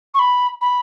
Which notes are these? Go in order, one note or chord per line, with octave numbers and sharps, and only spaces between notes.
C#6
B5
B5